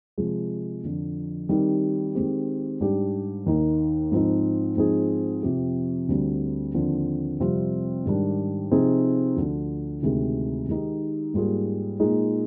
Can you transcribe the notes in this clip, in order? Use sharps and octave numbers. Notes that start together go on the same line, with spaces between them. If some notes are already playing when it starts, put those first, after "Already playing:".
C3 F3 G#3
F2 D3 F3
D#3 G3 C4 D#4 G4
D#3 G#3 C4 G4
G#2 G3 D4 G4
D#2 D#3 A#3 D#4
G#2 F3 C4 D#4
G#2 F3 C4 D#4 G#4
F2 C3 F3 C4 G4
D2 D3 G3 C4
D#2 D3 F3 C4
F2 C3 G3 C4 F4
G#2 D#3 G3 D4
C3 F3 C4 D#4 G#4
D2 D3 F3
D2 C3 D#3 G#3
D#3 G#3 D#4 G4
G#2 G3 A#3 F4 G#4
A#2 G#3 D#4 G#4